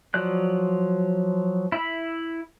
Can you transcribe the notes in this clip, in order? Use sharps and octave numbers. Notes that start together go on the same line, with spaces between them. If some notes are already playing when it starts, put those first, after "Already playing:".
F3 F#3 D5 F#6
E4 E5 B5